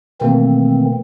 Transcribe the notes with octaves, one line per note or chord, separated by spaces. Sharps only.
B2 D#3 E3 A3 A#3 C4